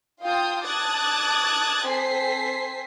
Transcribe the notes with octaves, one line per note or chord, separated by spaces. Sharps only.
F4 F5 G5 A5 D#6 G6
A5 D6 D#6 F#6 G#6 A6
C4 A4 C5 G#5 B6 C7